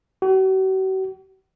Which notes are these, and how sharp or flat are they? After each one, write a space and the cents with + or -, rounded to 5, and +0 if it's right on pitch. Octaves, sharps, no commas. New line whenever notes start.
F#4 +45